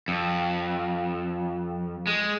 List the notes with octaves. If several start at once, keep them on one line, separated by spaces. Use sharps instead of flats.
F2
G#3